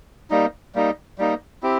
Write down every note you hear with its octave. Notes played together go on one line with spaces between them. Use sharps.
G3 A#3 D#4
G3 A#3 D#4
G3 A#3 D#4
C4 E4 G4